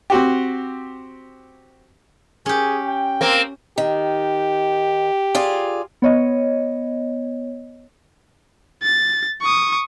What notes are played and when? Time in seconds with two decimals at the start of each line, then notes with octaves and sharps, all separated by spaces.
0.10 C4 F#4 G4
2.46 C#4 G4 G#4
2.86 G5
3.21 A#3 C4
3.78 D#3 G4
5.35 F4 G#4 D5
6.02 B3 C#5 D#5
8.83 A6
9.41 C#6 D#6